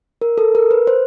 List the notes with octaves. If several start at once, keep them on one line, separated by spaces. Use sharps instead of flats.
A#4
A4
A#4
B4
C5